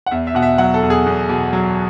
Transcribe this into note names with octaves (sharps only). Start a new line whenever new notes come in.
F#5
E2 E5
E5
B2 F#5
E5
F#3 F#5
A4
E2
G#4
E2
B2
F#3